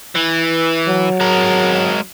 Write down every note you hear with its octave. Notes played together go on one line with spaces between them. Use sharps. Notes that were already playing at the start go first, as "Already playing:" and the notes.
E3
F#3
G#3 A#4